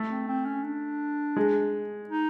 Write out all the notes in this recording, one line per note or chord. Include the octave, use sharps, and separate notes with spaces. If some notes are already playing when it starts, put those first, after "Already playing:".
Already playing: A3
C4
C4
C#4
D4
G#3
D#4